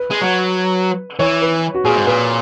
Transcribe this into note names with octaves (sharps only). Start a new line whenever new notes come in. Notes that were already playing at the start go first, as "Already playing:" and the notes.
Already playing: B4
G#3
F#3
E3 C#5
B4
F#4
A#2 G#4
G#2
A#2 B4